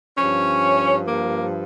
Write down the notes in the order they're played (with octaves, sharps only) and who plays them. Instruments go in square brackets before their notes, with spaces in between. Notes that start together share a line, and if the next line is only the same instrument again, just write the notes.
[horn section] G2 F3 C#4
A#3